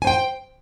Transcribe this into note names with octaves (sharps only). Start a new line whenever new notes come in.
C5 G5 G#5